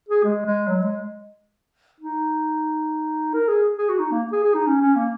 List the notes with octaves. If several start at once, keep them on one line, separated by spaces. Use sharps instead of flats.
G#4
G#3
G#3
F#3
G#3
D#4
A#4
G#4
G#4
F#4
D#4
A#3
G#4
G#4
D#4
C#4
C#4
A#3